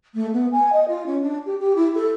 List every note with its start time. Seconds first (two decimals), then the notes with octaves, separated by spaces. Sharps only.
0.14 A3
0.33 B3
0.52 G#5
0.72 D#5
0.88 F4
1.06 C#4
1.21 D4
1.45 G4
1.58 G4
1.76 E4
1.95 A4